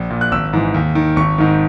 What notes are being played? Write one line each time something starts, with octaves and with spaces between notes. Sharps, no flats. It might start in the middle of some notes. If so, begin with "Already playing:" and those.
Already playing: A#1
A#2
F#6
G#1 E6
G#2 E3
D#2
D#3
G#1 C#6
G#2 D#3